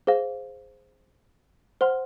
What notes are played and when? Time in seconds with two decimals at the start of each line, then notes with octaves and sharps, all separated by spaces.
0.07 G#4 C5 F5
1.81 C5 F#5 C6 F6